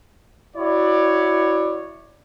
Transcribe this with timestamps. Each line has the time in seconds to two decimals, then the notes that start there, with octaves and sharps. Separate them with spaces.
0.56 E4 F#4 C#5 D5